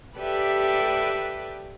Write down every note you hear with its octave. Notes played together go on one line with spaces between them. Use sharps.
G4 A4 B4 D5 E5